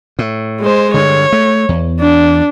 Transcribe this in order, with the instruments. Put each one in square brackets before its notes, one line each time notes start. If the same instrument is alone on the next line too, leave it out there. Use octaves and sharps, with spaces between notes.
[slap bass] A2
[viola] G#3 C5
[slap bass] G2 D3 [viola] C#5
[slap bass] A3
E2
[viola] D4